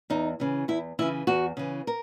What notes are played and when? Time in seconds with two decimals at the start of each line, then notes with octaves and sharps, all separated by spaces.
0.10 E2 D#4
0.40 C#3 E3
0.68 E2 E4
0.99 C#3 E3 E4
1.27 E2 F#4
1.57 C#3 E3
1.87 A#4